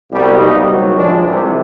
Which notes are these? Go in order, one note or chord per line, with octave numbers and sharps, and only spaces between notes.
C2 B2 G3
B2 G3 A#3 D#4
C#2 C3 D#3 F#3
A2 F3 G#3 D4
C2 C3 E3